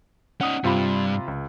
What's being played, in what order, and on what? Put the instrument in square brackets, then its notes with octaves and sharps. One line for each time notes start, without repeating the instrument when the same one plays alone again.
[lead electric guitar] C#4 D#4 [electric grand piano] F#5 D#6
[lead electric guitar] G2 [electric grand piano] C3 F4 B5
[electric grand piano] C#2